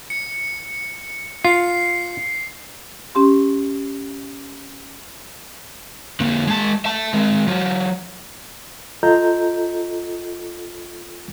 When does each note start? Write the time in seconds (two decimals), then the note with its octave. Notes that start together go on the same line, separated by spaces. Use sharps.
0.10 C#7
1.45 F4 C7
3.15 C#4 G4 C6
6.20 D3 A#3
6.47 G#3 A5
6.85 E5 A5
7.14 G#3 C4
7.48 F#3 F4
9.03 F4 A4 D#5 A#5 G6